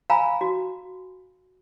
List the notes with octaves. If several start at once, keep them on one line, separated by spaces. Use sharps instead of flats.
F5 G#5 A#5 B5 E6
F#4